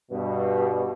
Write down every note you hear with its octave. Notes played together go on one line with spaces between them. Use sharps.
G2 B2